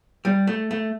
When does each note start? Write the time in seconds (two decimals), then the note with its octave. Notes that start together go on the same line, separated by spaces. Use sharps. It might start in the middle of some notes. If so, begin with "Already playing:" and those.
0.25 G3
0.47 A3
0.71 A3